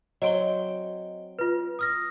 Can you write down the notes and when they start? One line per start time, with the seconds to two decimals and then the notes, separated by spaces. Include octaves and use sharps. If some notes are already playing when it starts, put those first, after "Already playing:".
0.22 F#3 C4 D#5 D7 G7
1.39 F4 B4
1.79 D#6 F6 A#6